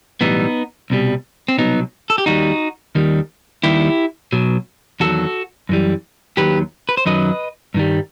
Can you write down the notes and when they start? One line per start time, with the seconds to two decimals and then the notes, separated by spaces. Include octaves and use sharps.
0.21 B1 A2 E3 G3 B3 D#4
0.90 C2 B2 G3
1.48 C4
1.58 C2 B2 F#3 B3 D#4
2.10 A4
2.18 G4
2.26 D#2 D#3 G3 D#4 F#4
2.95 D#2 D#3 G3
3.63 D#2 D#3 G3 E4 G4
4.32 B1 B2 F#3
5.00 E2 D#3 F#3 F#4 A4
5.69 F#2 E3 G3
6.37 D#2 D#3 F#3 G4 B4
6.89 B4
6.97 C5
7.06 F#2 D#3 F#3 B4 D#5
7.74 G2 D#3 G3